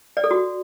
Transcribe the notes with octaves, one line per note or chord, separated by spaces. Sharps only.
D5
A4
F#4